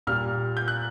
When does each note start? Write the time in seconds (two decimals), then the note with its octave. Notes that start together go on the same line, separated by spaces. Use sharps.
0.07 A#2 G3 F6
0.57 G6
0.68 F#6